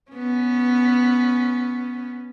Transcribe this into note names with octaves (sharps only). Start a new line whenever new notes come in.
B3 C#4